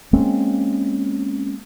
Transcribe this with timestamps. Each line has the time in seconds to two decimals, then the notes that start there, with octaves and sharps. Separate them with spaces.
0.13 G#3 A#3 C4 C#4